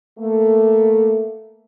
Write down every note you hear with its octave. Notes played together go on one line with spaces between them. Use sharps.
A3 A#3